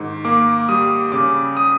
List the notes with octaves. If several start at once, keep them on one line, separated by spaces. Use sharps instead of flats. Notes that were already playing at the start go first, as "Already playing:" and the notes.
Already playing: G#2 D#3
A#3 D6
G3 D#6
C#3 D6
D#6